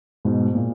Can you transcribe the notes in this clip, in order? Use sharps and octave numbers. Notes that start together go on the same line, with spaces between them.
G#2 B2
A#2